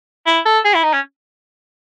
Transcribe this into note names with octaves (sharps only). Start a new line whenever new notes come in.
E4
A4
G#4
E4
D#4
C#4